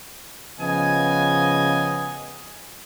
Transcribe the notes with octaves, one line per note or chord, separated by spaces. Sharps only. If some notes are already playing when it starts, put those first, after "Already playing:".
C#3 F3 B3 D#5 G#5